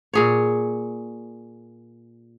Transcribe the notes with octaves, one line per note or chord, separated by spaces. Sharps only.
A#2 G#4 C#5